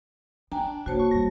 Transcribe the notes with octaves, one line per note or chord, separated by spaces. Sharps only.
D#3 D4 G5 G#5 A#5
C3 A#3 F#4 C5 C#5 A5
C#6
C2 G2 A#6